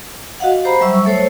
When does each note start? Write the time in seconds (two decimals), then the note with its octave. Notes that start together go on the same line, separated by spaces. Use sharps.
0.40 F#4 D#5 F5 F#5
0.65 G4 C5 A#5 B5
0.81 F#3 G3 E5 C#6 E6
1.05 A3 A4 C5 C#5